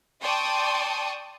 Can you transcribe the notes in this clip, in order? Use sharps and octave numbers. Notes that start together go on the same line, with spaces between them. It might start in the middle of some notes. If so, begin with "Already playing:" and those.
D5 G5 A5 C6 C#6 D#6